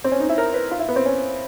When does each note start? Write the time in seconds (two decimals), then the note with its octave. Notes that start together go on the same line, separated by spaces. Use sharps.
0.04 C4
0.12 C#4
0.20 D#4
0.29 E4
0.38 A#4
0.54 B4
0.71 F4
0.79 E4
0.89 B3
0.96 C4
1.06 C#4